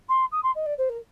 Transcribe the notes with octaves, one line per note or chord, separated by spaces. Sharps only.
C6
D#6
C6
D#5
D5
C5
A#4